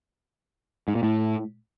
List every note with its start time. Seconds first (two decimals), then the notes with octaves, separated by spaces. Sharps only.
0.88 G#2
0.95 A#2
1.03 A2